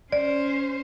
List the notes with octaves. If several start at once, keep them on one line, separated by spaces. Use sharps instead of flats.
C#4 C5 D5